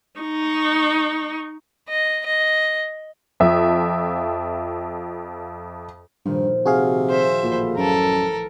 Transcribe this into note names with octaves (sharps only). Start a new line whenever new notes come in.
D#4 C#6
D#5
D#5
F2 F3 E5
G2 A#2 D#3 F3
C3 F#4 G#4 F5
C5 E5
A1 A#2
F#2 A4 A#4